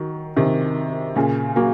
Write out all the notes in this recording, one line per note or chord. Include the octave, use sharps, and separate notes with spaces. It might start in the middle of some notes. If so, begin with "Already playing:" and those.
Already playing: D#3 F#3
C3 D#3
A#2 C#3
F#3 A#3